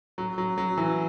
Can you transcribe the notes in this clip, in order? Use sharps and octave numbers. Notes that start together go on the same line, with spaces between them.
F#3
F#3
F#3
E3